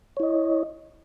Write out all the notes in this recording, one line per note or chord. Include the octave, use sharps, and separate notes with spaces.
E4 C#5 D#5